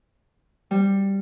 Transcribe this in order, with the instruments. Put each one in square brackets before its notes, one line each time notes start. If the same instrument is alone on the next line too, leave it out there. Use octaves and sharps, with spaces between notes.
[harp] G3